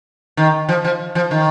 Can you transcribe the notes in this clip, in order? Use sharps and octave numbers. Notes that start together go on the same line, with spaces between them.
D#3
F3
F3
F3
D#3